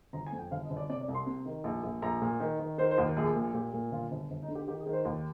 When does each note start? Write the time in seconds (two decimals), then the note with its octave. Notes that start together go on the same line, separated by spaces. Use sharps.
0.13 G1 A#5
0.27 G#5
0.32 F2
0.38 G5
0.51 G1 F5
0.64 D#5
0.70 G1
0.77 D5
0.89 C3 D5
1.01 D5
1.08 C2
1.14 C6
1.27 C3
1.45 D#3
1.64 A#1
1.83 A#1
2.02 A#1 A#5
2.22 A#2
2.40 D#3
2.59 D#3
2.78 D#3 C5
2.91 C5
2.98 D#2
3.04 A#4
3.17 A#1 G#4
3.36 A#2
3.54 A#2 G4
3.73 A#2
3.91 G1 F4
4.11 G1
4.30 G1
4.43 D#4
4.48 D3
4.55 G4
4.68 D#3 G4
4.80 G#4
4.86 D#3
4.93 C5
5.05 D#2